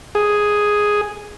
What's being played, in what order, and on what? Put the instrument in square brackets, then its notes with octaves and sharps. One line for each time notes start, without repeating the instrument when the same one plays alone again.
[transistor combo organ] G#4